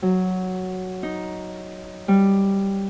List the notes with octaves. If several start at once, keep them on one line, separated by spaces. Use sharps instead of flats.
F#3
D#4
G3